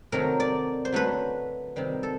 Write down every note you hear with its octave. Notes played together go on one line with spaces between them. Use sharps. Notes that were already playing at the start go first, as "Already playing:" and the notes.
C3 D#3 F#3 A3 A#4
D5
C5
D3 F#3 A3 B4
C3 D#3 G3
A4